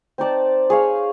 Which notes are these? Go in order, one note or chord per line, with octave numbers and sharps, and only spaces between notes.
C4 D#4 D5 A5
G#4 C#5 F5